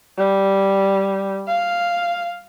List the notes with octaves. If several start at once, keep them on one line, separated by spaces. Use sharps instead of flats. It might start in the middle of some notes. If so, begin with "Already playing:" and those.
G3
F5